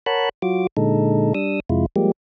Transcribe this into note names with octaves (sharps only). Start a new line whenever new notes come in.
A#4 C#5 F#5 A5 B5 F#6
F#3 F4 F#4 D6
A#2 D3 G#3 D#4 A4
G3 D4 D#6 E6
F2 C3 G#3 E4 F4
F3 G3 G#3 A#3 G4